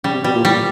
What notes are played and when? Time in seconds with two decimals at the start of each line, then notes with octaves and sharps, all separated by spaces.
0.04 C#3 G3
0.14 C3
0.24 B2 G3
0.35 A#2
0.45 A2 G3
0.52 A#2